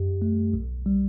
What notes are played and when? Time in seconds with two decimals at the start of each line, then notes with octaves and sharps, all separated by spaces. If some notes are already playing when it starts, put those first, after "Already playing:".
Already playing: F#2 G4
0.22 A3
0.53 B1
0.86 G3